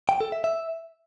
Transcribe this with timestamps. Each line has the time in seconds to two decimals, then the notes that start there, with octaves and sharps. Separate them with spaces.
0.09 G5
0.21 A4
0.32 E5
0.44 E5